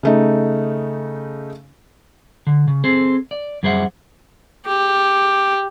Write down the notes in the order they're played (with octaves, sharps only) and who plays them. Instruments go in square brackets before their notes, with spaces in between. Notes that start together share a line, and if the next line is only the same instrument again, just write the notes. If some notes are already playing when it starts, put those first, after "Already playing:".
[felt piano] C#3 A3 D#4
[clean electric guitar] D3
C#3
C4 G#4 A4 C5
D5
F#2 G3 G#4 C5 E5 F#5
[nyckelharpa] G4